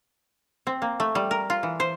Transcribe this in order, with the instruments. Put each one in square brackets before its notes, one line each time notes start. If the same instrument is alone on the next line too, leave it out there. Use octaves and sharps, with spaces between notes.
[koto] C4
A#3
A3
G3
A#4
F4
E3
C5